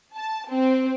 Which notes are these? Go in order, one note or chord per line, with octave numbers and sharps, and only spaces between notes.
A5
C4